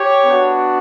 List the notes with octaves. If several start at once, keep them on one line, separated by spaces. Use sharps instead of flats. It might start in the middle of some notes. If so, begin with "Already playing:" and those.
Already playing: G4 C#5
B3 D4 F#4